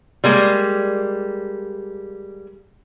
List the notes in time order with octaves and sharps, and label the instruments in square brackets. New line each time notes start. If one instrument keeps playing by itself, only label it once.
[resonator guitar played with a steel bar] G3 G#3 A#3